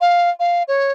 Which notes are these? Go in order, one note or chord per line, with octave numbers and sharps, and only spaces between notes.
F5
F5
C#5